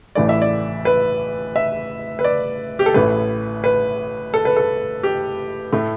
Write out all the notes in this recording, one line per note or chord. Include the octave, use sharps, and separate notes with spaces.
A1 A2 E3 A3 D5
E5
D5
B4
E5
B4
D5
G4
A4
A1 A2 A3 B4
B4
A4
B4
A4
G4
A2 A3